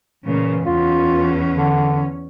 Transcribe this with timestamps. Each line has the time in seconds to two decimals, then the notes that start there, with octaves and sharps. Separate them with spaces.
0.24 A#2 C#3 E3
0.65 E2 C#4 F4
1.56 D3